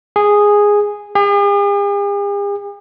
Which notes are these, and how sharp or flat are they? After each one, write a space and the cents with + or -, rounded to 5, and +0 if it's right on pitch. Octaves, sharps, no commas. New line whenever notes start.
G#4 -5
G#4 -45